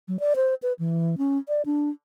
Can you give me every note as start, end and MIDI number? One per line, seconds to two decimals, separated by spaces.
0.08 0.17 54
0.20 0.34 74
0.36 0.54 72
0.62 0.73 71
0.79 1.16 52
1.18 1.38 61
1.49 1.62 74
1.66 1.90 62